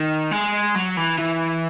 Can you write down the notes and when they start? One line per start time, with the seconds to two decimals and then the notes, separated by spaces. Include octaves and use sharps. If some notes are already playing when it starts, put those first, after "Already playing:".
Already playing: D#3
0.31 G#3
0.75 F#3
0.97 E3
1.19 E3